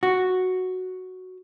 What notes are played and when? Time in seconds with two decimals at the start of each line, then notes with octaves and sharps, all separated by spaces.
0.03 F#4